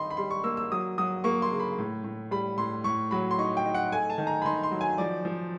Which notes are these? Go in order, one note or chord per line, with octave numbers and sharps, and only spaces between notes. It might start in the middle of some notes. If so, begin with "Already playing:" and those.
Already playing: D#3 D#4 B5 C6
B5
G3 C6
C#6
A#3 E6
E6
F#3 D#6
F#3 D#6
A#3 C#6
C6
C#3
B5
A2
A2
G3 B5
A2 C6
A2 C#6
F#3 B5
C6
D#4 C#6
G5
D#4
F#5
A3 G#5
A5
D#3
A#5
B5
D#3 C6
C6
F#3
G#5
F3 D5
F3